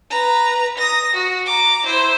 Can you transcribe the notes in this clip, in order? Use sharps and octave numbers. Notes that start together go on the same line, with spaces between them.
B4 A#5
D#6 A#6
F#4
A#5 D6
E4 C5